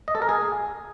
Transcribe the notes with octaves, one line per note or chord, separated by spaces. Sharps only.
D#5
A4
A#4
G#4